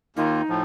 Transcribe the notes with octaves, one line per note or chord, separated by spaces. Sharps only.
D#2 D#3 A#3 D#4 F4
A2 F3